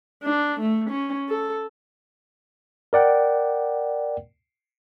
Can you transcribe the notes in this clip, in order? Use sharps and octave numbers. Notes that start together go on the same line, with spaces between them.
D4
A3
C#4
A4
A#4 D5 F#5 G5